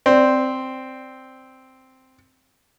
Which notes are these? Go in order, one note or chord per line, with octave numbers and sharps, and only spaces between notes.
C4 D5